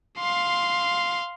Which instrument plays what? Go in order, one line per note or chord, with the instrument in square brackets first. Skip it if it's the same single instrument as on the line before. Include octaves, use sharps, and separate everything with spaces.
[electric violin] F5 C6